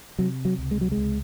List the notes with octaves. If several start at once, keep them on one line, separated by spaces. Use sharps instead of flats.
C3 F#3
F#3
C#2
G#3
F#3
G#3
C#2